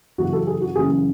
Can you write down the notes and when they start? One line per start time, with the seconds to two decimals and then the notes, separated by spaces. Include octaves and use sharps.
0.18 F#2 C#3 E3 F#4
0.33 A4
0.47 G#4
0.61 F#4
0.76 F#2 C#3 E3 G#4